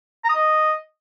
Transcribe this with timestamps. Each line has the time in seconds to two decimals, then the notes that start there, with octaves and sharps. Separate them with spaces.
0.24 A#5
0.29 D#6
0.34 D#5